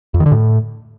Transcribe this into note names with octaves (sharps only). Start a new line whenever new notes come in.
F2
D#3
D3
A2